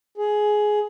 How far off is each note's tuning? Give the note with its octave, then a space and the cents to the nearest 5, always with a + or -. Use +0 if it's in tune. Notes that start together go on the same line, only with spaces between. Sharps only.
G#4 +15